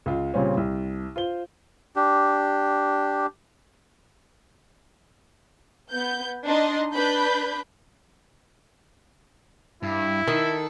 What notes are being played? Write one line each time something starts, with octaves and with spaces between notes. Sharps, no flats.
C#2 F4
A#2 C#3 G3 C4 C#4
C2
F4 C5 G7
D4 G4
B3 G6
D4 D#4 D#5 C6
D4 B4 B5 G6
G2 E4
D#3 A4